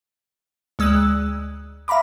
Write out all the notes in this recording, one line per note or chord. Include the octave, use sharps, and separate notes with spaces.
D2 G#3 D#6 E6 F#6
E5 F5 A#5 B5 D6